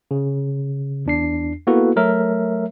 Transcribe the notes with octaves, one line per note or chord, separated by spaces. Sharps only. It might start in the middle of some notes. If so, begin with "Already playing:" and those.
C#3
E2 D4 C7
A#3 B3 E4 F#4 A4 B4
F#3 A3 A#4 C#5 E5